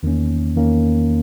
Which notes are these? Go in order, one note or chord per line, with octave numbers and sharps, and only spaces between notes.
E2 D#3 A#3 C#4
E2 D#3 A#3 C#4